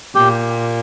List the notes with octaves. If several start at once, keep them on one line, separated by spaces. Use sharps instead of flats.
A#2 G4